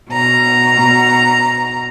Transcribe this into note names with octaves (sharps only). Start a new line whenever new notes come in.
B2 A#5